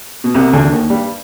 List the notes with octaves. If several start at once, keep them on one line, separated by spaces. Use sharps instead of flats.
B2
C2 C3
D2 D3
D3
D#2 D#3
G2 G3